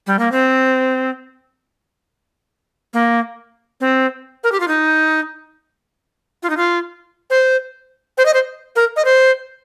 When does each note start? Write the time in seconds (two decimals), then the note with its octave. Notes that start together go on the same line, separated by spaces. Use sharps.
0.07 G3
0.19 A#3
0.32 C4
2.93 A#3
3.80 C4
4.44 A#4
4.52 G4
4.60 F4
4.68 D#4
6.43 F4
6.50 D#4
6.57 F4
7.30 C5
8.18 C5
8.26 D#5
8.34 C5
8.76 A#4
8.96 D#5
9.05 C5